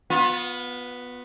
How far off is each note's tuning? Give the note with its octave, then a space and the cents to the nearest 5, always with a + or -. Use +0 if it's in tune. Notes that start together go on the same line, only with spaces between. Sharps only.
B3 +0 F4 +35